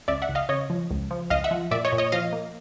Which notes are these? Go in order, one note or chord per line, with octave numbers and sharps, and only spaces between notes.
C#2 D5 E5
E5 F#5
C#2
D#5 F5
C#3 C#5 D#5
F3
C#2
F3
C#2 D#5 F5
E5 F#5
F3
A#2 D5 E5
C#5 D#5
A#2
C#5 D#5
F3 D#5 F5
A#3